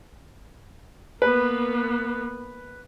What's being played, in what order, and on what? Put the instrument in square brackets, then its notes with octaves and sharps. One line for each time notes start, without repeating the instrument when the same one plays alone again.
[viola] A#3 B3 [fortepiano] B4